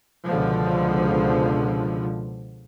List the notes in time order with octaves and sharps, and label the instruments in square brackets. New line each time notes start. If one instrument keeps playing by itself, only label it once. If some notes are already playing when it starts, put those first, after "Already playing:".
[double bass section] C#2 B2 D3 F3